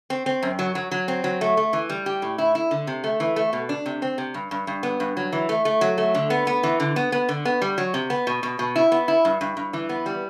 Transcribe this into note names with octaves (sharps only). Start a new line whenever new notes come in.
C4
C4
F#2
F#3
F#3
F#3
C4
F#3
A3
A3
E3
G3
G4
A2
E4
E4
D3
C3
A3
E3
A3
B2
D4
C3
C4
C3
G2
G2
G2
B3
G2
F#3
E3
A3
A3
F#3
A3
D3
B3
B3
E3
D3
B3
B3
D3
B3
G3
F#3
C3
B3
B2
B2
B2
E4
B3
E4
G2
G2
G2
E3
B3
G3